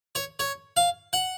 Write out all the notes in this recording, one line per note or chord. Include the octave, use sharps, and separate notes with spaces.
C#5
C#5
F5
F#5